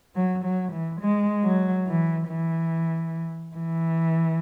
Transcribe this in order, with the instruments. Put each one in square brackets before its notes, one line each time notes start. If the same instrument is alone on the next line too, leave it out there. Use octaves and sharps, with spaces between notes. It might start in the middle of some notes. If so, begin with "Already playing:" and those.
[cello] F#3
F#3
E3
G#3
F#3
E3
E3
E3